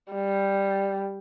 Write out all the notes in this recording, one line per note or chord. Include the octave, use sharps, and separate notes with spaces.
G3